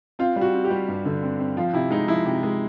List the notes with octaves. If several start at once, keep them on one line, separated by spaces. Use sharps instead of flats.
C4 F4
G3
F#4
C4
G4
G3
G2
D3
C4
C4
F3 F4
C3 E4
G#3 D#4
F3 E4
C3
G#3